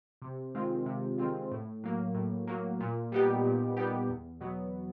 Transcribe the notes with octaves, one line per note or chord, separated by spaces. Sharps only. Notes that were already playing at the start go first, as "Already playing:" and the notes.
C3
D#3 G#3 C4 F4
C3
D#3 G#3 C4 F4
A2
F#3 A#3
A2
F#3 A#3
A#2
G3 B3 D#4 G4
A#2
G3 B3 D#4 G4
E2
B2 F#3 B3